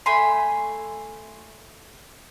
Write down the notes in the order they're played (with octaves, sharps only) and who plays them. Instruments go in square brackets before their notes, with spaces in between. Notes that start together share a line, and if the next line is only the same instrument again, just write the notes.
[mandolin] A3 G#5 B5 C6